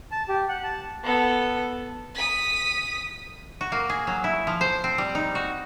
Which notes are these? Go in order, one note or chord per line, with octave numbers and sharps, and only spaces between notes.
A5
G4
F#5
A5
B3 A4
D#6 B6
F#4
A#3
G#4
F#3
E4
F3
C5
C4
G3
D#4
F#4